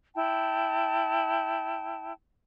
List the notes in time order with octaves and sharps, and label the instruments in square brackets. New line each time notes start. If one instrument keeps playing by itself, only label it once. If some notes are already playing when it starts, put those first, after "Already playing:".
[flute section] E4 G5 A5